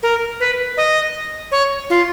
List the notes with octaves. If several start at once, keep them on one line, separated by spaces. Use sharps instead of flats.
A#4
B4
D#5
C#5
F4